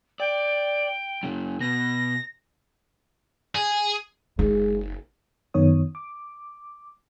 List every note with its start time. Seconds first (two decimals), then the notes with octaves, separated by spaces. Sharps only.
0.20 D5 G5
1.23 F#2 C#3
1.60 B2 A#6
3.55 G#4
4.39 F#1 G#3 D#4
5.54 F#2 D#3 B3 C#5 D#6
5.95 D6